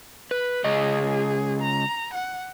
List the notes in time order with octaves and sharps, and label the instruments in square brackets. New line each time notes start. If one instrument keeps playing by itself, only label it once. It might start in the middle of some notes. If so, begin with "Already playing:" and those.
[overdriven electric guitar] B4
[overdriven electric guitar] C#2 D#5 [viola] G#4
[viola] A#5
F#5